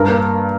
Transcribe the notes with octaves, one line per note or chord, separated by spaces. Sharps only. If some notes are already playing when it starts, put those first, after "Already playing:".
Already playing: G2 A#4
A#3